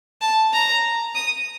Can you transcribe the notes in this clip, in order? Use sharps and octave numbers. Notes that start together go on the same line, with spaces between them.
A5
A#5
D#6